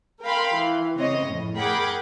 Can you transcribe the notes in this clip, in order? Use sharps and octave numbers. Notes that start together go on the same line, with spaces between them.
A#4 F5 G5 B5 C6
E3
C#3 C4 C#5 D#5
F2 A2
G#4 A#4 F#5 G5 B5 D6